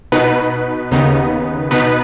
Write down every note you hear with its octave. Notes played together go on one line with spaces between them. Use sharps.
B2 B3 D#4 B4
D#2 C#3 B3 D#4
B2 B3 D#4 B4